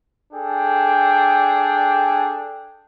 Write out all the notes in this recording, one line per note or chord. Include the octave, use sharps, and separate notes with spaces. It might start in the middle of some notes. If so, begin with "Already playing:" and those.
D4 G#4 A4 G5